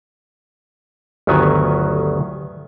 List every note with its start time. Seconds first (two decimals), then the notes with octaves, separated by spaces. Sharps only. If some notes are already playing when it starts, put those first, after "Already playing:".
1.27 G1 D2 D#3 F#3 B3 G#5